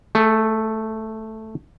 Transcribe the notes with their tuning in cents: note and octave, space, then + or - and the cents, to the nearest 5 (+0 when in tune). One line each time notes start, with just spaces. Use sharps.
A3 +0 G#4 +40